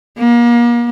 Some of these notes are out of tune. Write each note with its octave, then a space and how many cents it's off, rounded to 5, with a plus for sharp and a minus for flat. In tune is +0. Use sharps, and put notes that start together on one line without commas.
A#3 +35